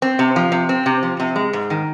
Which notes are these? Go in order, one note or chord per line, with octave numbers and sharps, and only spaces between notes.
C4
C3
F3
C3
C4
C3
F3
C3
G#3
G#2
D#3